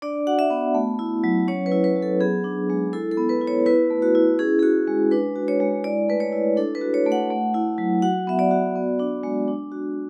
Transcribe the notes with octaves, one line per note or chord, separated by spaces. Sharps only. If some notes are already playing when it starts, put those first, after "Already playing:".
D4 D5
F#4 F#5
E5
B3
A3
E4
F#3
C#4 C#5
B4
E4
B4
F#3
A4
B3 G#4
D4
G#3
E4 A4
A4
B3
B4
E4
C#5
E4 B4
A3
F#4
E4
C#4 G#4
G#4
F#4
G#3
D4 B4
F#4
C#5
G#3
E4 D5
A3 B4
C#5
E4
D4 A4
B4
F#4
C#5
A3
F#5
A3
E4
F#3
F#4 F#5
B3 E5
D5
F#4
B3
D4
G#3
D4
F#4